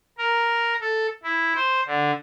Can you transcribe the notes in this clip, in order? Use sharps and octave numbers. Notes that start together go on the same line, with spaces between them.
A#4
A4
E4
C5
D3